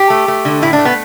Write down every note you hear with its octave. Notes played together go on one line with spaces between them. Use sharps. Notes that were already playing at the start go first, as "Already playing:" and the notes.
Already playing: G4
A3
A3
D3
A2 E4
D4
A3
B3